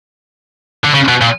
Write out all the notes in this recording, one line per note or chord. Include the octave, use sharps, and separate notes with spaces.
D3
C#3
B2
A#2